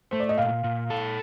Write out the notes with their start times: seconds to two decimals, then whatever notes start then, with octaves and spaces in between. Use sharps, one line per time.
0.11 A3 C5
0.20 D5
0.29 D#5
0.38 A#2 F5
0.64 A#2
0.90 A4